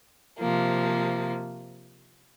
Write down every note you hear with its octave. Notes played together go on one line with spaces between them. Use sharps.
C3 F3 A#3